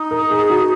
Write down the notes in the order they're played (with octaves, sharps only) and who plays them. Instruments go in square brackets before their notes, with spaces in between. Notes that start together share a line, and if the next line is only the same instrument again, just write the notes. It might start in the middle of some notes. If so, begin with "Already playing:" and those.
Already playing: [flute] D#4
[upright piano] A#4
G#4
F#4